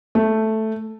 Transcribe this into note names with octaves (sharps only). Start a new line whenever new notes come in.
A3